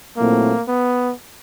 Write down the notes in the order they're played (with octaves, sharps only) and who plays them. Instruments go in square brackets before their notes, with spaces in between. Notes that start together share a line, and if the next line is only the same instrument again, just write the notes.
[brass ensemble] A#2 F#3 A3 C4 E4 [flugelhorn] A#3
[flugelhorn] B3